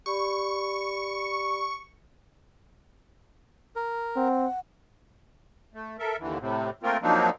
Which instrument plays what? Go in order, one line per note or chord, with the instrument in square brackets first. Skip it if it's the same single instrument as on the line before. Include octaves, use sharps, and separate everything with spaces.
[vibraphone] G4 D5 B5 [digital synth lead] C#6
[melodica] A#4
[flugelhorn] C4 [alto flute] F#5
[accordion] A3
A4 A#4 E5
D#2 D3 E3
A2 C3
A3 A#3 C4 F4 A#4
F3 F#3 A#3 C4 D4 D#4